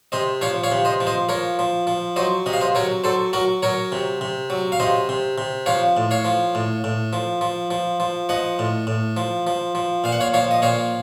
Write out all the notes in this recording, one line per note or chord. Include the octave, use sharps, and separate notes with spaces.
C3 C5 D#5
F3 C#5 F5
C#5 F5
C3
C5 D#5
F3
C5 D#5
F3 A#4 C#5
F3
F3
F#3 C5 D#5
C3 D#5
F5
C5 D#5
F#3 A#4 C#5
F#3 A4 C5
F#3 F#4 A#4
F#3 A#4 C#5
C3
C3
F#3
F5
C3 C5 D#5
C3
C3
F3 C#5 F5
A2
C#5 F5
F3
A2
A2
F3
F3
F3
F3
F3 D#5 F#5
A2
A2
F3
F3
F3
A#2 F5
F#5
C#5 F5
F3 C#5 F5
D#5
A#2 C#5 F5